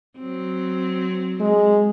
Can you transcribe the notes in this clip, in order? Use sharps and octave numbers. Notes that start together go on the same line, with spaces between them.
F#3 C4
G#3